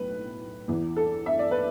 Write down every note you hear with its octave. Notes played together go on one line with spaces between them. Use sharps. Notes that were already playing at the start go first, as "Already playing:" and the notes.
Already playing: B1 A2 B4
E2 E3
A4
E5
D5
B4